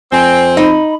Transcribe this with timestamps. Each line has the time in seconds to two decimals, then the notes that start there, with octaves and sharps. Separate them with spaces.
0.12 F2 C4 G#5
0.57 D#4 B5